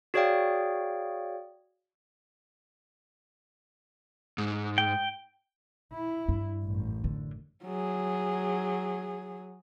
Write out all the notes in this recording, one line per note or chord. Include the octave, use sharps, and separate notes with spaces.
F#4 G#4 C#5 D5 F5 G5
G#2
G5
E4
G2
A1 F#2
D3
F#3 G#4